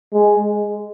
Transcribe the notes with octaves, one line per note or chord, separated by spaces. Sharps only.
G#3